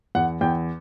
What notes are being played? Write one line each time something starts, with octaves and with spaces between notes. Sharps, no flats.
E2 F#5
E2 G5